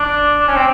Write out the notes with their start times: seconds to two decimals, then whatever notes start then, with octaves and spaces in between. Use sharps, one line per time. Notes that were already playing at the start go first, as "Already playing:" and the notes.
Already playing: D4
0.39 D4
0.48 C#4
0.56 C4